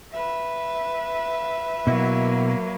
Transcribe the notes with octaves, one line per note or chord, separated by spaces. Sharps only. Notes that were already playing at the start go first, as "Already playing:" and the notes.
B4 E5
B2 F#3 A#3 E4 F#4